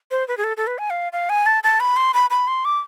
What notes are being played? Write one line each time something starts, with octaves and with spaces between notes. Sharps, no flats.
C5
B4
G#4
A4
A4
B4
G#5
F5
F5
G#5
A5
A5
B5
C6
B5
B5
C6
D6